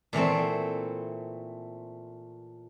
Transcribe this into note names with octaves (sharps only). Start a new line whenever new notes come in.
A#2 E3 A3 C4